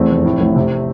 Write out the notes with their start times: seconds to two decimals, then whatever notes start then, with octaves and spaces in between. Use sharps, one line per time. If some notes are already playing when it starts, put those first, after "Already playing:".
Already playing: E2 A3 C4
0.10 F1
0.25 A2
0.40 A1
0.55 C3